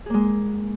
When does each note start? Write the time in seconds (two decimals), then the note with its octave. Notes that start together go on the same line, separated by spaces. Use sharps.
0.06 G#4
0.10 A#3
0.14 G#3